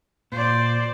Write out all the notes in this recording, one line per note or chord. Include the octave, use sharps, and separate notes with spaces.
A#2 C5 D5